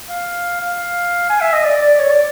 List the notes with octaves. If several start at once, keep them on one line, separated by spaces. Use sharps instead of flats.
F5
F5
G#5
E5
D#5
D5
D5
C#5
D5